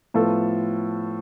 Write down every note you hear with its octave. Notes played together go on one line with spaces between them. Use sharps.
A2 F3 B3 F4 A4